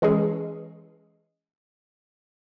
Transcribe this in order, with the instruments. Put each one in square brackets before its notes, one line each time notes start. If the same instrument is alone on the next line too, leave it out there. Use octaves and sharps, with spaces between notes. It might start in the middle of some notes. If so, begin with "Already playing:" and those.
[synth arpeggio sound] E3 G#3 C#4 G#4